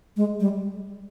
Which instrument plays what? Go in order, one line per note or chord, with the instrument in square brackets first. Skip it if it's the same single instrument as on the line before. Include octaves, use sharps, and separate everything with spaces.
[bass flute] G#3
G3